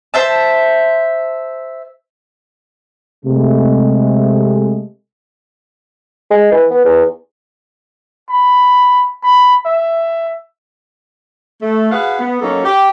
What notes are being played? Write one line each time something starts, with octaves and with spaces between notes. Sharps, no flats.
C5 E5 A5
C3 G#3 A3
G#3
E3
B3
E2
B5
B5
E5
A3
F#4 G#4 B4 F5 F#5
B3
F#3 A#3 C#4 D#4 A4
G4